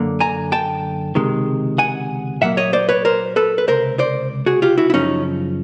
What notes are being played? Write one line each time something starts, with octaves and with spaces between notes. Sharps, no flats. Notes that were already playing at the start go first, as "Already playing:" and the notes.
Already playing: F#2 D3 A#3
G#5 A#5
G5 A5
C#2 C3 D#3 G#3
F#5 G#5
A#2 F#3 A#3 E5 F#5
C#5 D#5
C5 D5
B4 C#5
A#4 C5
A4 B4
B4
C#2 C3 A#4 C5
C5 D5
F#4 G#4
F4 G4
E4 F#4
E4
F#2 C#3 F3 C#4 D#4